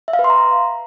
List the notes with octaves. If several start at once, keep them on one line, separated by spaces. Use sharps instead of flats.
E5
F5
B4
C6
A#5